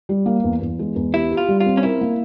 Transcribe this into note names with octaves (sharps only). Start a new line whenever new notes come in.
G3
A#3
E2
E2
G#3
E2
E4 G4
G4
F4
G3
F4
C4
C#4
E4 A#4
A#3